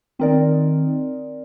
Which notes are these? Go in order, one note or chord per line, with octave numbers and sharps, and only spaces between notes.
D#3 C4 D#4 A#4 D5